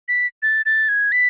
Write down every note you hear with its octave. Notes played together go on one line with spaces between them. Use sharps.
B6
A6
A6
G#6
B6